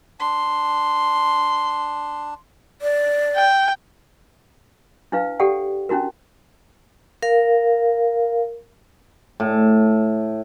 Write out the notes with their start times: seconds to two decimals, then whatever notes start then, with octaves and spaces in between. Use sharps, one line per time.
0.20 D4 C6
2.82 D5
3.36 G5
5.12 D4 E4 B4 F5
5.40 G4 A4 D5 F#5 G5
5.89 C#4 D4 E4 F#4 A#4
7.22 A#4 F5
9.40 A2